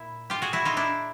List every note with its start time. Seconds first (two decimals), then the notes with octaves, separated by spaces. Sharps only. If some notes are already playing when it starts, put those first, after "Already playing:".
Already playing: A#2 E4
0.30 F4 G4
0.42 F#4 G#4
0.53 E4 F#4
0.65 D#4 F4
0.77 D4 E4